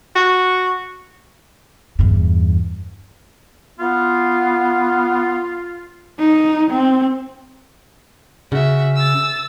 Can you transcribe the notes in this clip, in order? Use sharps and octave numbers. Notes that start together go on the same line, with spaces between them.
F#4
E2 G2
B3 F4
D#4
C4
C#3 F#4 E5
E6 A6